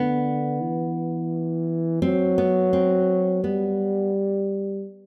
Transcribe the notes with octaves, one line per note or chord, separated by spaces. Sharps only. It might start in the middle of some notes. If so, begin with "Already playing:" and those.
Already playing: D3 B3
E3
F#3 C4
B3
C4
G3 B3